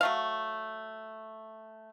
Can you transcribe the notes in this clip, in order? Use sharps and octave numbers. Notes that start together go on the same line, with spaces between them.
F#3 A3 F5